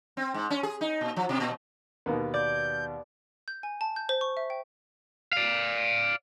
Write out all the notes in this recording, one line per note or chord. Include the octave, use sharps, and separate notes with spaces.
C4
G#2
C#4
G#4
D#4
A#2
F3
B2
A#2
D#2 B2 D#3 A#3 B3
D5 G6
G6
G#5
A5
G6
C5
C#6
E5
G5
D5 F5